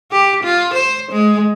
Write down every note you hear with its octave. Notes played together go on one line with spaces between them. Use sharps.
G4
F4
C5
G#3